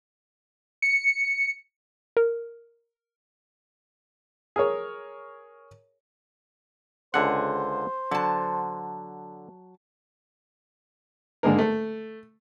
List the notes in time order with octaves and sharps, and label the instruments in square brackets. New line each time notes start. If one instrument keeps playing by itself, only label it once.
[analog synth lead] C#7
[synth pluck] A#4
[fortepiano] G#4 A#4 C#5
[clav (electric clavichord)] C#2 D3 F#5 [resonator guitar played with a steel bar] G#4 [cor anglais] C5
[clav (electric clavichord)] D3 [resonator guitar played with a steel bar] F#3 A5
[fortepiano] G#2 D3 G#3 A#3 A#4
A3